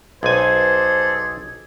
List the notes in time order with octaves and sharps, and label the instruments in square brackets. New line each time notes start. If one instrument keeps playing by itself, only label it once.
[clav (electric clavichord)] B1 G#5 [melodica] G#4 A4 D5 [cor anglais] C5 [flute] G#6